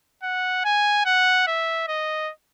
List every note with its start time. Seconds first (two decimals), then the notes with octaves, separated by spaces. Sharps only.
0.23 F#5
0.65 G#5
1.06 F#5
1.47 E5
1.88 D#5